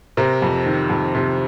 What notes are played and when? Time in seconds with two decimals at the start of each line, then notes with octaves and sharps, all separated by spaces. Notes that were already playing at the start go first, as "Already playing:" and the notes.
0.17 C3 A#4
0.42 F2
0.66 D#3
0.90 F2
1.15 C3